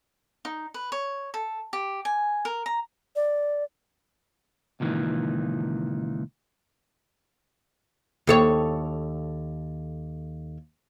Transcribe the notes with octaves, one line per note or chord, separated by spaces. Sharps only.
D#4
B4
C#5
A4
G4
G#5
A#4
A#5
D5
C#2 A#2 D#3 E3
D#2 A4 C#5